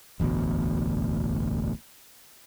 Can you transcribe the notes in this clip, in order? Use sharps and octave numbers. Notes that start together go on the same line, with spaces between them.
E1 A1 D2 B2